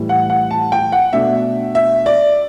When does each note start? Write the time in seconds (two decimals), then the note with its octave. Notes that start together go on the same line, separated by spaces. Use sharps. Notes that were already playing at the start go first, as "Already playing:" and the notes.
Already playing: A2 E3 G3
0.09 F#5
0.30 F#5
0.51 A5
0.72 G5
0.92 F#5
1.13 B2 A3 D4 E5
1.75 E5
2.06 D5